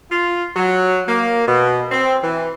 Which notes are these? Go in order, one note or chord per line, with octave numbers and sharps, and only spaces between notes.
F4
F#3
A#3
B2
C4
E3